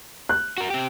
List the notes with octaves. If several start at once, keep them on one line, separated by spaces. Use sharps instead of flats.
F#6
F#4 A#4
C4 G4